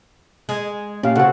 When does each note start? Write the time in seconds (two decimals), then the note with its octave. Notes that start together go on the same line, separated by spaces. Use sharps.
0.49 G#3
1.03 A#2 C#4 G4 F5
1.16 C#3 C4 F#4 A4 F#5